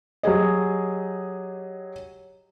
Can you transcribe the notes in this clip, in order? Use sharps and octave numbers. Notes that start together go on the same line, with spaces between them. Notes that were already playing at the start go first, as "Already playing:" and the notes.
F#3 G4 G#4 D#5